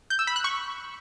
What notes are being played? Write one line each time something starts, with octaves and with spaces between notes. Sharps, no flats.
G6
E6
B5
F#6
C#6